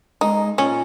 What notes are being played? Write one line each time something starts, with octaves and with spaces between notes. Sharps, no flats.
G#3 D#4
A#2 C#4